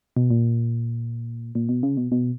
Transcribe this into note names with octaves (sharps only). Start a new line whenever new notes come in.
B2
A#2
A#2
B2
C#3
B2
B2